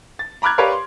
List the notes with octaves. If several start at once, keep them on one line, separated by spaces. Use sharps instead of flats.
A6
A#5 B5 D6 F6 F#6 G#6
G4 A#4 B4 C#5 D5 F5
C6